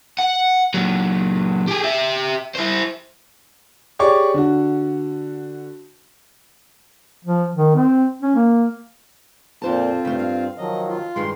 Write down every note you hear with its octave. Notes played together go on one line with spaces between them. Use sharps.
F#5
A#2 F#3
G4 G#4
G4 E5
E4 C5
G4 G#4 C#5 D5 C#6 D6
D3 F#4
F3
D#3
C4
C#4
A#3
F2 A#2 C4 F4 C5 A5
G2 C#3 A3
F5
D#3 F3 F#3 D#5
F4
G2 D#3 G#3 C6